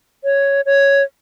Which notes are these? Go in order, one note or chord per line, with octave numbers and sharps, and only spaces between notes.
C#5
C#5